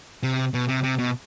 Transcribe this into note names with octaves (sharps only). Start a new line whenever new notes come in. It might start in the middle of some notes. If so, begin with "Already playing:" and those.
C3
B2
C3
C3
B2